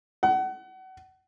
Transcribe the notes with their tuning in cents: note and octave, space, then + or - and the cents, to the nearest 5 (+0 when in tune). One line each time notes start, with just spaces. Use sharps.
F#5 +30